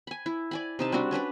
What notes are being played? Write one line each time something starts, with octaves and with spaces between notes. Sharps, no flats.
G#5 B5
E4
D5 G#5 B5
C3 D#4 A5
G3 C4 D4 F#4
C#4 D4 B4 D5